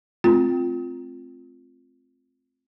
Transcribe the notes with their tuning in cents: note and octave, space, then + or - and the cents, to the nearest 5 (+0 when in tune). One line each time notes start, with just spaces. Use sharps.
A3 -35 C4 +0 F4 +0